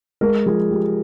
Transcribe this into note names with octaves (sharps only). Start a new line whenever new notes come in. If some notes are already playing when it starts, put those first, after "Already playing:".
G#3 A#4
F3 G#4
G#3 G4